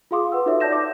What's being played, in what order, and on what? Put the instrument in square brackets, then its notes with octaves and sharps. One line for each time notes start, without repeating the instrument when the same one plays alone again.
[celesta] F4 G#4 F5 C6 D6 D#6
B4 F#5 E6
D#4 F4 F#4 A4 C#5 E5
D5 A5 G6 A#6 E7
D6